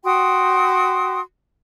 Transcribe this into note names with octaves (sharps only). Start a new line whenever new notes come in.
F#4 G5 C6 D#6